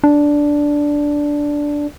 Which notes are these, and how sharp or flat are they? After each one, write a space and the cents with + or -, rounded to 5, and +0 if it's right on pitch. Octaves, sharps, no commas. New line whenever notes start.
D4 -5